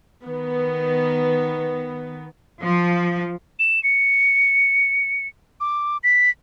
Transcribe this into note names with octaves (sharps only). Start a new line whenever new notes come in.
D#3 B3
F3
E7
C#7
D6
B6